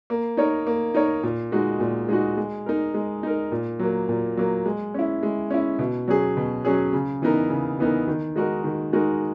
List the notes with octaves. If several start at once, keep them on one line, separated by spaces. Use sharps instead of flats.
A#3
D#4 A#4 C#5
A#3
D#4 A#4 C#5
A#2
G#3 D#4 F#4
A#2
G#3 D#4 F#4
G#3
D#4 A#4
G#3
D#4 A#4
A#2
F#3 A#3
A#2
F#3 A#3
G#3
C#4 E4
G#3
C#4 E4
B2
F#3 C#4 G#4
B2
F#3 C#4 G#4
C#3
E3 B3 D#4 A#4
C#3
E3 B3 D#4 A#4
D#3
G#3 D#4 F#4 A#4
D#3
G#3 D#4 F#4 A#4